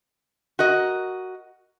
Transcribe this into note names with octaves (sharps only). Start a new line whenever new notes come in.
F#4 A#4 D#5